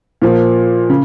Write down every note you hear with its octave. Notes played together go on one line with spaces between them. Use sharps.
A#2 F3 A#3
C#3